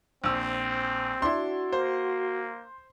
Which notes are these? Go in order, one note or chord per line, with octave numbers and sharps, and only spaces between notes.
A#1 C4 E6
D4 E4 F#4 C6
A#3 C5